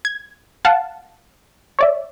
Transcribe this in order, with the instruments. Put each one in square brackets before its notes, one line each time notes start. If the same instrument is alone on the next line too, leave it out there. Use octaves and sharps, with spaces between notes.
[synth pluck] G#6
F5 F#5 A5
C#5 D5 E5